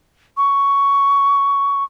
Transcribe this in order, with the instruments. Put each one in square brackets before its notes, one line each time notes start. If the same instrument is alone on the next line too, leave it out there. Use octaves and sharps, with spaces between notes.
[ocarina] C#6